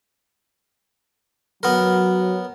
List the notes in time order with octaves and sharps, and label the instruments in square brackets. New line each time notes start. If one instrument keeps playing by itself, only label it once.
[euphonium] F#3 [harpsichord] B3 A#4